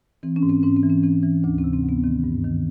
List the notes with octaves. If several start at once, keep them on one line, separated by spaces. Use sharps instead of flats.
E3 C4
C#4
G#2
C4
G#2 C#4
C4
E3
C#4
E3 C4
E3
D2 D4
C4
C3
C4
D2
B3
D#3 C4
G2
D#3